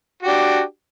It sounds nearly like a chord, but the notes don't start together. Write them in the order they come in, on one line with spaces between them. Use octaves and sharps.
F#4 G4 D4